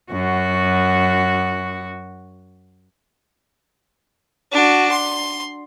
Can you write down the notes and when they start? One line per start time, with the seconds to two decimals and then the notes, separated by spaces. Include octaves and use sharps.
0.12 F#2 F#4
4.52 D4 F#4
4.91 C6